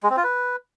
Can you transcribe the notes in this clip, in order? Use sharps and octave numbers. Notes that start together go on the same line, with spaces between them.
G#3
C4
F4
B4